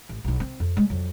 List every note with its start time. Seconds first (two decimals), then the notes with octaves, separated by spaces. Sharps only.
0.09 A1
0.24 B1 D#4
0.40 C4
0.60 F2
0.77 G#3 C#4
0.90 F2 F#3